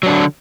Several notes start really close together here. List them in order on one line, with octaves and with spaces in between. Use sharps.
F#3 D4 D3